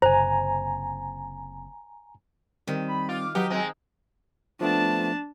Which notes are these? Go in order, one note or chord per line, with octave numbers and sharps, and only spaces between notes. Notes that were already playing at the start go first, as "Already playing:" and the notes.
F#1 C3 C5 G#5 A#5
D#3 G3 C4
B5
F4 D6
F#3 D#4 G4 B4 F#5
G#3 C4 G#5
F3 A3 B3 D4 A5